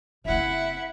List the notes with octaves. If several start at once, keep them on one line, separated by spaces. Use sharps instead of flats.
F#1 C4 E4 E5 F#5